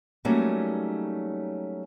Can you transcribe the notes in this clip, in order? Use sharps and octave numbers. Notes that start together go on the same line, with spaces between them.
F#3 G3 A3 A#3 C#4 D#4